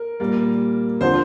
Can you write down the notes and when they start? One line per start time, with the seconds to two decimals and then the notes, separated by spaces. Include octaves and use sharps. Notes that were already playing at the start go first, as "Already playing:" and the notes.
Already playing: A#4
0.20 A#2 G3 A#3
1.01 D3 F3 C4 C5